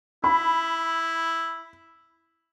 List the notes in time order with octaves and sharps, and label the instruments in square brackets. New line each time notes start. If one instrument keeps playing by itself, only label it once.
[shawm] E4 [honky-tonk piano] B5